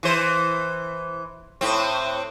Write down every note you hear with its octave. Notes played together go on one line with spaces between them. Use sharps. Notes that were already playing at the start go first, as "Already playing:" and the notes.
E3 C5
A2 C4